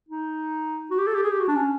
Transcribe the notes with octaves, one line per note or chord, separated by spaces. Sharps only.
D#4
F#4
G4
A4
G4
G#4
G4
F#4
D4
C#4